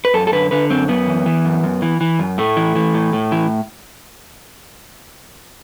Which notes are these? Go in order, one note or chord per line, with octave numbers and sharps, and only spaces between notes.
B4
F#2 A4
A4
D3 B4
D3 B4
F#2 C4
F#2 B3
E3
E3
F#2
F#2
E3
E3
F#2
A2 A3
E3
E3
A2
A2
E3